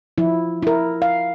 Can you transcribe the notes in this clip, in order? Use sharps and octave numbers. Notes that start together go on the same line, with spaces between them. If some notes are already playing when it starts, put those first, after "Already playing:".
F3 E4
E4 A#4
F5